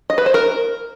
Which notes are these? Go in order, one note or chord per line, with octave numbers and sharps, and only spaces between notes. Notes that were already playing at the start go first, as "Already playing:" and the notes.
D#5
B4
C5
A#4